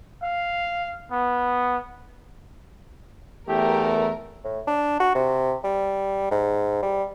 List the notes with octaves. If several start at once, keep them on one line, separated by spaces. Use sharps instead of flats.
F5
B3
E2 A3 G4 A#4
A2
D4
F#4
C3
G3
G#2
G3